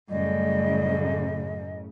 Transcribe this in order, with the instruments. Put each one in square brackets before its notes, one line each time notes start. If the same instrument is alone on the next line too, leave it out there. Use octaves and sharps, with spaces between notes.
[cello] F#2 [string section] A2 C#3 [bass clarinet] G3 [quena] D#5